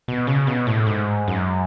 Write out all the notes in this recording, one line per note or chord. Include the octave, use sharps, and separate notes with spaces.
B2
C#3
B2
A2
G#2
F#2